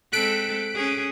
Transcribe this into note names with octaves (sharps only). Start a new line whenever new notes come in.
G#3 C4 A4 F#6 B6 D7
C#4 G#4